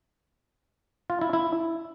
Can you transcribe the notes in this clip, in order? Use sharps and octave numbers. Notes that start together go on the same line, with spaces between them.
F4
E4
E4